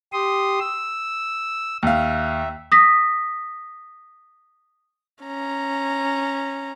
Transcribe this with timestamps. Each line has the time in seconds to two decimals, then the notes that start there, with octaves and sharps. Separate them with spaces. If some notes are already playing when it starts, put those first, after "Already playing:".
0.12 G4 C6 D#6
0.60 E6
1.83 D#2 E5 F5
2.72 D#6 A#6 B6
5.23 C#4 A#5